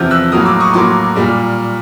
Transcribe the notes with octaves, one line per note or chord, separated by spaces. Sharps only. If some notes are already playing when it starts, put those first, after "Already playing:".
Already playing: E2 C3 F3 F6 G6
E6 F#6
A2 F#3 A#3 D#6 F6
D6 E6
C#6 D#6
A2 F#3 A#3 C6 D6
A#2 G3 A#3